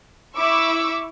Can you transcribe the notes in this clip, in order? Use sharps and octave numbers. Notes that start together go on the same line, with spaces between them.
E4 C#6 D6 E6